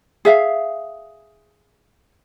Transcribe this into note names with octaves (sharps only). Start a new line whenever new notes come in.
G#4 E5 F5